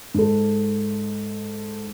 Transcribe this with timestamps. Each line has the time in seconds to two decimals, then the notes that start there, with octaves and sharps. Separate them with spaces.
0.14 G#2 A4